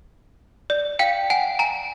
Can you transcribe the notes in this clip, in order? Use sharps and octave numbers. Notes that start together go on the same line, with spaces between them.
D5
F5 G5
F#5 G#5
G#5 A#5